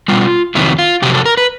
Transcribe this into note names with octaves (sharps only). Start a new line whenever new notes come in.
B2 G3 F4
F2 C3 D#3 F#3 E4
F4
F2 C3 F#3 G4
A4
A#4
B4